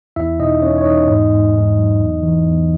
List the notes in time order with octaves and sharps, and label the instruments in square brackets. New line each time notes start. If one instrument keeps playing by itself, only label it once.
[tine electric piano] E2 E4 E5
B2 D#4 D#5
E2 C#4 C#5
C#5
E2 D#4 D#5
G#2
G#2
G#2
F#3
E2
E3
E2